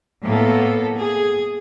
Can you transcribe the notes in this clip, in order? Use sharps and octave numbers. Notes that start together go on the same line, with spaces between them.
A2 A#3 B3 A4
G#4